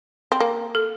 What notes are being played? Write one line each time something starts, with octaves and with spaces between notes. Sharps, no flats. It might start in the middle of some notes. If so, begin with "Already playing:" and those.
C4
A#3
A4